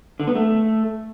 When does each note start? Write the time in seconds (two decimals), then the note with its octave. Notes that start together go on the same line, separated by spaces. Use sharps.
0.20 D3
0.27 B3
0.35 A3